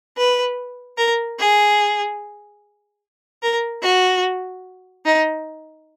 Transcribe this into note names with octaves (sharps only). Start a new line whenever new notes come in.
B4
A#4
G#4
A#4
F#4
D#4